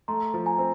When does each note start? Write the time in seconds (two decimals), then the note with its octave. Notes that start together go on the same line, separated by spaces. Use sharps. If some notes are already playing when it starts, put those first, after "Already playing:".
0.08 A3 A#5 C6
0.34 F3
0.46 G#5 A#5
0.59 C4